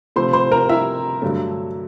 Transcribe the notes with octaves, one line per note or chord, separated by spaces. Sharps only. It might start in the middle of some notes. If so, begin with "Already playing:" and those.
C3 F3 A3 C5 C6
C5 C6
A#4 A#5
E4 E5
G2 D3 F#3 A3